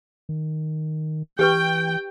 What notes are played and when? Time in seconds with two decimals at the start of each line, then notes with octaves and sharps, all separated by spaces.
0.29 D#3
1.39 E3 G4 B4 G5 C#6